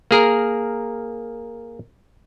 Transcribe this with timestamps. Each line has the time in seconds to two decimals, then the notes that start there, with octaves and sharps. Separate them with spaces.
0.11 A#3 G#4 A#4